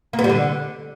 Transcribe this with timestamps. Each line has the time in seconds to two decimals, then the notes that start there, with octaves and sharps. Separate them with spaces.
0.13 A#3
0.19 B3
0.24 G3
0.29 D3